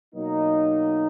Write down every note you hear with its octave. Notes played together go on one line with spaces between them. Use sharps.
B2 F#3 A#3 D#4